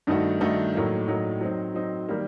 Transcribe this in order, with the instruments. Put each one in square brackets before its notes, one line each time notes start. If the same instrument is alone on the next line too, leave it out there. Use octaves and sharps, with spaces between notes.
[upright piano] G2 D#3 A3 D#4 F#4
G2 D#3 A3 D#4 F#4
A2 F#3 A#3 D#4
A2 F#3 A#3 D#4
F#3 C4 D#4
F#3 C4 D#4
D#3 G3 A#3